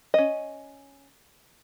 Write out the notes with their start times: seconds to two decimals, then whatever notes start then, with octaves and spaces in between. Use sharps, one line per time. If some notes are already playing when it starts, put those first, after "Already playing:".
0.14 C#4 D#5